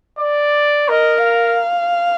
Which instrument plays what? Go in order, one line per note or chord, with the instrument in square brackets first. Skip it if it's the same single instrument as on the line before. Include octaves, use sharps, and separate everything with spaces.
[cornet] D5
[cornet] A#4 [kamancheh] D#5
[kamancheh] F5